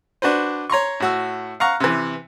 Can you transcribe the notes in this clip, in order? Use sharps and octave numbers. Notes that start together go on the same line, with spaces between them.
D4 F#4 B4 C5
C#5 A#5 C6 C#6
A2 F#4 E6
F5 F#5 A#5 C#6
C3 E3